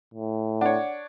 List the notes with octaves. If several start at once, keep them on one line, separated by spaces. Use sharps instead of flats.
A2
D4 C#5 F#5